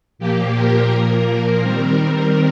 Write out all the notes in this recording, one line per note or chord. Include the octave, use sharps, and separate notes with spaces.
A#2 F3 A#3 G4
A#4
A#2 F3 A#3
D#3 G3 C4